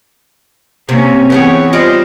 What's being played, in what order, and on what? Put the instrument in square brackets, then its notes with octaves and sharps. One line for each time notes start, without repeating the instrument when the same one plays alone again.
[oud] C3 [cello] A#3 C#4
[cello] E3 C#5 [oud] B3 G4 G#4
[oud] G3 F4 D5 [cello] C5 D#5